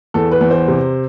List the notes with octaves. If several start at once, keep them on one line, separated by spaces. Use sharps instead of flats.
E2 A4
B4
E2
C5
C3